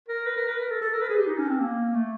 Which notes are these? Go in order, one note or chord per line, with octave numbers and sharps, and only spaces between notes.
A#4
B4
A#4
B4
A#4
A4
A4
A#4
B4
G#4
G4
D#4
C#4
C4
A#3
A3